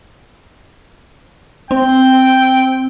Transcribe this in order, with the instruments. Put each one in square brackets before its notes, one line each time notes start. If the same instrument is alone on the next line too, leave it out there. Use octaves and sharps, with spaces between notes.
[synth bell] C4 [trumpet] G5